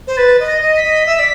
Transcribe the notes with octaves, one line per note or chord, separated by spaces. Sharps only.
C5
B4 A6
D#5
A#6
D#5
B6
D#5
E5
D5